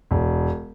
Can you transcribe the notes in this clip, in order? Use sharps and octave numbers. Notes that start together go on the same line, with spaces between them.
E1